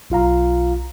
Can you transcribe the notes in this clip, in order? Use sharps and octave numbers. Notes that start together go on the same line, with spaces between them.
B1 F4 F5 A#5